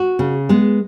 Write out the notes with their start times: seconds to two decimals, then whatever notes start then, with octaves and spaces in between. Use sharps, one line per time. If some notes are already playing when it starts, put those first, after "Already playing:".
Already playing: F#4
0.19 C#3
0.49 G#3 B3